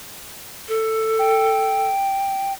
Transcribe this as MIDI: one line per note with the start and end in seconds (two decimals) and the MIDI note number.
0.68 1.88 69
1.19 2.53 79